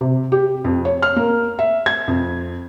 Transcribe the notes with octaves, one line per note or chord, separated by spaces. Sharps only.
C3
G4
F2
C#5
F6
A#3
E5
G#6
F2